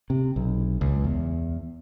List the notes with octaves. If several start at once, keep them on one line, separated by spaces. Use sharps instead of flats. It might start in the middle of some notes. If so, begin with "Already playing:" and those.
C3
B1
C#2
E2